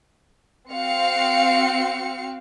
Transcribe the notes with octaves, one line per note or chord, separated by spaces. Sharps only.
C4 F#4 F5 C#7